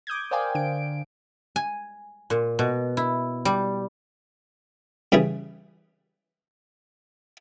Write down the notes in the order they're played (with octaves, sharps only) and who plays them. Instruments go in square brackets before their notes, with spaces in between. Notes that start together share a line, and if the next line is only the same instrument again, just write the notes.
[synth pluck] D6 D#6 G6 G#6
A#4 C5 D5 F5 G5 G#5
D3 D4 D7
[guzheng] G#5
A#2
B2
E4
G3
[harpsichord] C#3 E3 G3 G#4